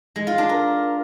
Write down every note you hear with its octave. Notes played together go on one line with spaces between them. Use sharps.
G#3
F4
D4
A#4